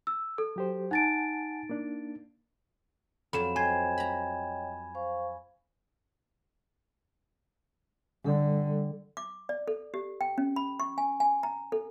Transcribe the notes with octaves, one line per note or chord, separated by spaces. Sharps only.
E6
A4
F#3 G4 C5
D#4 F#5 G#5 A5 A6 D7
A#3 D4
F2 F#3 B5 E7
C5 C#5 D#5 G5 G#5 G#6
A#5 B5
C5 F5 C#6
D3 G3 A4
D6
D5
A4
G4
G5
C#4
B5
C#6
G#5
G#5
A#5
A4